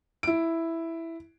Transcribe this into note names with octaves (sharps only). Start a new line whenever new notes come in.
E4 D7